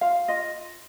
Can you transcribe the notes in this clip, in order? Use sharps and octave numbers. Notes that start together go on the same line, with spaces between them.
F4 F5
F4 D#5